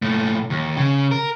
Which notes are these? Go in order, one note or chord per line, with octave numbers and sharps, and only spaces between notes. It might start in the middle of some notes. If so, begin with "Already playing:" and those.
A#2 A3
D#2
C#3
A#4